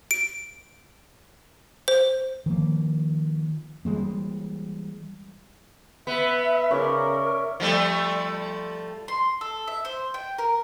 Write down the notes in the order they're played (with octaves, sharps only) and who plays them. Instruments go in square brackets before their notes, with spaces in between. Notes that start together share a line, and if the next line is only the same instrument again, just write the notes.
[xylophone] D7
C5
[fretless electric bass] D#3 F3 A#3
E3 G3 G#3 A#3
[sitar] B3 [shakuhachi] E5
[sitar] C#3 [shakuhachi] A#4 [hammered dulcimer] C#5 D5 E5
[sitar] F3 G3 A3
[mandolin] C6
A4
E5
C5
G5
A#4